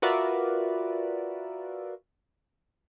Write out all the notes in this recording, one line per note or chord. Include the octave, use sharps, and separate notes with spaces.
F4 F#4 A#4 B4 D5 E5